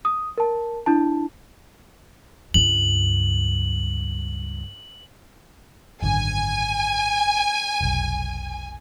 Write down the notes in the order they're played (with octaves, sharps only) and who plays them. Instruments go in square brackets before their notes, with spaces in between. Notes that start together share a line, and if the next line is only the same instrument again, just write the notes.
[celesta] D#6
A#4 A5
D4 E4 A5
[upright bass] C#2 G2 [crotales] F#7
[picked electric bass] G#1 F#2 D3 [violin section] G#5
[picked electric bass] F1 B1